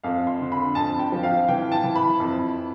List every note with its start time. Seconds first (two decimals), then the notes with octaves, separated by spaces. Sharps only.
0.04 F2 F5
0.27 C6
0.40 D3
0.52 B5
0.75 F2 A5
0.99 G5
1.12 F3
1.23 F5
1.48 E3 G5
1.72 A5
1.84 E3
1.95 B5
2.20 F2